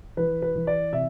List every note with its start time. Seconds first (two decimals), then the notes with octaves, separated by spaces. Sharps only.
0.17 E3 B4
0.42 B4
0.55 E3
0.67 D5
0.93 C3 E5